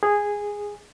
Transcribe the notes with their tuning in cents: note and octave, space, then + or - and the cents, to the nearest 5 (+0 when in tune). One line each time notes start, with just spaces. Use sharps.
G#4 -10